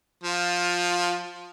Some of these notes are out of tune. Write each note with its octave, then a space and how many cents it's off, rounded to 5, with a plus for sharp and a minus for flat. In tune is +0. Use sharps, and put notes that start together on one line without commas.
F3 +10 F4 +15